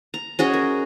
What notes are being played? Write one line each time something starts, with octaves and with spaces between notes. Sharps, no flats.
A#5
C#4 F#4 G#4 D#5
A#4